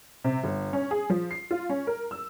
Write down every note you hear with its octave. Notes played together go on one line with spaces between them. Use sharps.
C3
G1
C#4
G#4
F3
C7
F4
C#4
A#4
E6